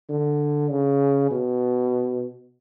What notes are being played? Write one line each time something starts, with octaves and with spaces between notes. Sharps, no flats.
D3
C#3
B2